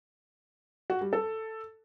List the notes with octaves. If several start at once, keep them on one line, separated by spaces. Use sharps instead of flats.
F#4
G3
A4